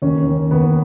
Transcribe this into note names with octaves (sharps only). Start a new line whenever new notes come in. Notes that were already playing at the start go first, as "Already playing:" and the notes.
D#2 C#4
D#2
D#2 B3